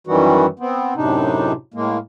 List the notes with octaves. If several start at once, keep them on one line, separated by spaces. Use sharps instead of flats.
F#2 D#3 E3 G3 F#4
B3 C4
F#2 A2 C3 D4 D#4
A2 G#3 A#3